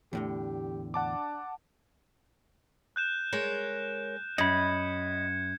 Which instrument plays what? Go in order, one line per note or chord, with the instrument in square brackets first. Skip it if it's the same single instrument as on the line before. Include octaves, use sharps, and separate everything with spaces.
[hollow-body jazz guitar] E2 A2 D3 [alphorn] G4
[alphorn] D4 [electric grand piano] F#5 A5 D6
[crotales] F#6 G6 E7
[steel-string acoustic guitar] G#3 A#4 C#5
[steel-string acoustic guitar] F#2 [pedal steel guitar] D#5 B5 [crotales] G#6 C#7